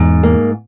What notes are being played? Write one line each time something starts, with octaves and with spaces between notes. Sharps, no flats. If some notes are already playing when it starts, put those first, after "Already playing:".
Already playing: E2 G#2
A#3